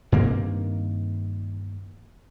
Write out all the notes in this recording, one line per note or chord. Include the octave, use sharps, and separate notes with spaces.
G2 D#3 A#3 C4